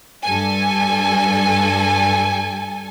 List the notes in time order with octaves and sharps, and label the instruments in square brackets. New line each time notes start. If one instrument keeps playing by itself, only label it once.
[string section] G2 A4 G#5